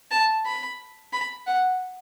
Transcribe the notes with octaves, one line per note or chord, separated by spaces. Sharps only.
A5
B5
B5
F#5